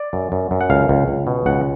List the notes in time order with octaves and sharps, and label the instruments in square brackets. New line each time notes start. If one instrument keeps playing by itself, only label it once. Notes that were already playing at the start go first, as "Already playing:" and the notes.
Already playing: [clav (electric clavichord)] D5
F#2
F#2
F#2
F#5
C#2 F5
C#2
C#2
B2
C#2 F#5